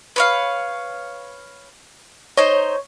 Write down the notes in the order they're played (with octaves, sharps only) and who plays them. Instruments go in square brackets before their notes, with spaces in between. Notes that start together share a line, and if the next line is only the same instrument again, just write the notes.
[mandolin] B4 C#5 F5
[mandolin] D#4 C5 [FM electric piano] C#5